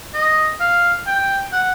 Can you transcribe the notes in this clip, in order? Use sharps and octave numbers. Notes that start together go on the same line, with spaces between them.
D#5
F5
G5
F#5